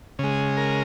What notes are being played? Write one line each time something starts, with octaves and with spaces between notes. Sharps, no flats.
C#3 G#3
A#4